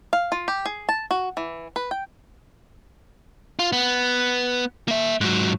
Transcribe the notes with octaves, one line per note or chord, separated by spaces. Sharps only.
F5
F4
G4
G#4
A5
F#4
E3
B4
G5
F4
B3
A#3 E5
G#2 F#3